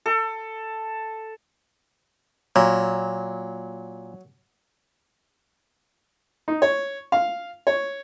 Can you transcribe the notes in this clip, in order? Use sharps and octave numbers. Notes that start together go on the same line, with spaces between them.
A4
A#2 F#3
D#4
C#5
F5
C#5